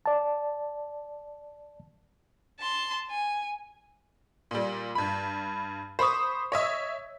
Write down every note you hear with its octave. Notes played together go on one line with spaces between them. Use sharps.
D5 A5
A5 C6
G#5
A#2 G3
G2 B5
C5 B5 C#6 D#6
C#5 D#5 E5